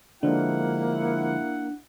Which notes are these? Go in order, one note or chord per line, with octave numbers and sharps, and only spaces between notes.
D3 F3 G#3 A#3 D4 E4 F#5